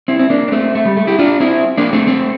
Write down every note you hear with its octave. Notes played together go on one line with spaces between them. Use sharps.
C4 E4
C4
A#3 D4
D4
A3 C4
A3
G3
A3
E4 G4
D4 F4
C4 E4
A#3 D4
A3 C4
A3 C4